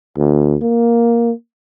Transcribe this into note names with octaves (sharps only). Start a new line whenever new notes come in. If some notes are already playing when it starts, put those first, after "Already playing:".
D2
A#3